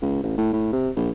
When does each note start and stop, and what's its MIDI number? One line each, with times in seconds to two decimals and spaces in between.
0.02 0.22 37
0.23 0.34 33
0.38 0.53 45
0.53 0.68 45
0.73 0.90 48
0.96 1.10 34